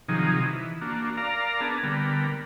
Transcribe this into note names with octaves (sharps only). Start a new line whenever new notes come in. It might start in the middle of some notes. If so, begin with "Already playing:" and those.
C3 D#3 F3 F#3 D#4 G#4
E3
A#3 D4 F#4
A#4 D5 F5 A#5
B3 D4 G#4 A5
D3 G3 B3 A#4